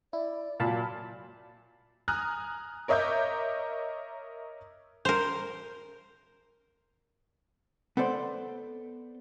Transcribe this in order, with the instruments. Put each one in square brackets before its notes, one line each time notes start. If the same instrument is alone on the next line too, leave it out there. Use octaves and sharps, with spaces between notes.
[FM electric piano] E4 [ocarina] D5
[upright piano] A#2 F#3 [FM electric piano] F5 A5 B5
[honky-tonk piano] G#5 A#5 D#6 F6 F#6
A#4 C#5 D#5 E5 D6 G6
[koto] A#4 C5
[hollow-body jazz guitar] B3 A4 C5 D5 C6